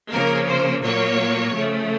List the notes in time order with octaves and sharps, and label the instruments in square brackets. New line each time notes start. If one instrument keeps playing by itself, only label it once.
[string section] C#3 F3 A#3 A#4
C5
A#2 F#3 A#3 C#5
C#3 F3 A3